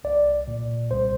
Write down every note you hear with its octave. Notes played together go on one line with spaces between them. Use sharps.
C2 D5
A#2
C2 C5